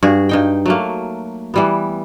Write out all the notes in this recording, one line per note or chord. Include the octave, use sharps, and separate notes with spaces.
G2 F#4 G#4
G2 D#4 G5
F#3 A3 A#3
E3 G3 B3